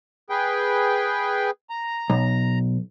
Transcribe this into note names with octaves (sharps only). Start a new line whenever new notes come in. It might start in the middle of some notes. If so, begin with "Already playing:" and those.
G#4 B4 G5
A#5
B1